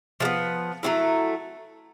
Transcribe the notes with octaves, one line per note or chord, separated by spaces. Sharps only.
F3 G#3 B3
F#3 A3 C4 E4